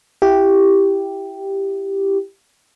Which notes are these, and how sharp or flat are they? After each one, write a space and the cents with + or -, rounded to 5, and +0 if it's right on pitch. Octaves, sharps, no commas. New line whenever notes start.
E4 +10 G4 +0